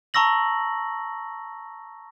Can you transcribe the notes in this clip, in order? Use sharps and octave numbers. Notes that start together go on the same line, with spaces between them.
A5 A#5 C#6 E6 A#6 F#7